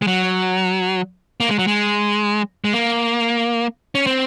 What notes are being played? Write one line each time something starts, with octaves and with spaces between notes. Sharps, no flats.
G#3
F#3
A#3
G#3
F#3
G#3
G#3
A#3
C#4
C4